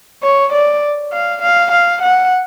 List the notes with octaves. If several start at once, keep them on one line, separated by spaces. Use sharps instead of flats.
C#5
D5
F5
F5
F5
F#5